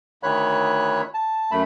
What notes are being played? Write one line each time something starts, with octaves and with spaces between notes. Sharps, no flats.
D2 D#3 C#5 B5 F#6
A5
F#2 A3 B5